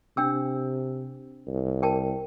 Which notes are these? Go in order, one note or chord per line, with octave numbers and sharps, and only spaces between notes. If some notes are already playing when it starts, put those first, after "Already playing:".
C3 D4 G5 E6
C2
A#4 G5 A5